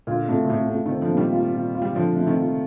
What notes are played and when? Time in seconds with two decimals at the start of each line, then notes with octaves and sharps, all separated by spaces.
0.07 A#2 D3 F4
0.28 A2 C3 A3
0.44 A#2
0.49 A2 C3 A3
0.70 A3
0.86 C3 D#3
0.91 C4
1.01 D3 F3
1.12 A#2
1.17 D#3 G3
1.32 F4
1.54 A#2
1.74 F4
1.82 G3
1.95 D3 F3 F4
2.16 A3
2.26 C3 D#3
2.37 F4